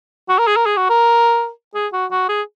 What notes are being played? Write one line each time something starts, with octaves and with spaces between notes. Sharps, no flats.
F#4
A#4
G#4
A#4
G#4
F#4
A#4
G#4
F#4
F#4
G#4